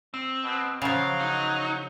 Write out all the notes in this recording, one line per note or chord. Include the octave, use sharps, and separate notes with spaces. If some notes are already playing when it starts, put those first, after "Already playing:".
C4
B2
C#3 F3 F#3 F5
D#4